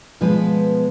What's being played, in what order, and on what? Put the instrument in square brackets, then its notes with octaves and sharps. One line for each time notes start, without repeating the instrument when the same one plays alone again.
[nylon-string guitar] B2 F3 G#3 B3 B4